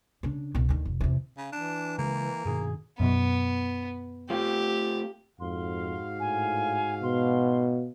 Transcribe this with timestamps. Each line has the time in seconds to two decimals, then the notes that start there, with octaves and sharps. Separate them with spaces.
0.23 C#3 D4
0.55 C2 B2
0.69 D2 D#3
0.85 F1
1.00 E2 C3
1.38 C#3
1.52 E3 D4
1.99 C#3 G#3 A#3
2.45 G2 B2 D#3 G#4
3.00 F#2 B2 F#3 B3
4.30 A3 C4 F4 G4
5.40 F2 G#2 F#4 F5 C6
6.20 A2 G#5
7.03 B2 C6